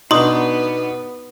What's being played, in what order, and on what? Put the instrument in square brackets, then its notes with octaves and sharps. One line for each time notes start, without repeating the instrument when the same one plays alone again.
[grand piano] B2 D4 [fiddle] B3 B4 [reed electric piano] D#4 [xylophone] C6 D6 D#6